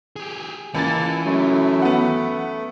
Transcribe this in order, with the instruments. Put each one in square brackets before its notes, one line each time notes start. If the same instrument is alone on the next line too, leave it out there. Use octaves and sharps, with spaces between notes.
[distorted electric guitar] G4 G#4
[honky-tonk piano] C#2 A6 [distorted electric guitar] E3 [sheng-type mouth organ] A#3 G#5 A5
[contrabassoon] F#2 [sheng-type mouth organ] A3
[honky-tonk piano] B3 F#5